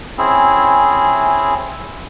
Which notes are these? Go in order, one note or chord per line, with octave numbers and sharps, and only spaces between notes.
C4 C#4 E4 G#4